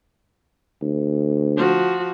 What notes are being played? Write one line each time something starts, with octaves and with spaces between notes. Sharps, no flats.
D2
F3 F#4